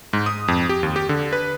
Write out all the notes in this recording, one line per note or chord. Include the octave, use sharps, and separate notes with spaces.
G#2
D#6
F2
G4
D#2
G4
D3
B4